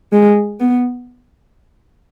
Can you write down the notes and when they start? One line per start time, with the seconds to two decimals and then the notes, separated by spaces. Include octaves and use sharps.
0.13 G#3
0.60 B3